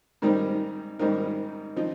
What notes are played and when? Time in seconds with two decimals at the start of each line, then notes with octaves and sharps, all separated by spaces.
0.22 G#2 D#3 G3 C4 D#4 A#4
0.99 G#2 D#3 G3 C4 D#4 A#4
1.76 F3 C4 D#4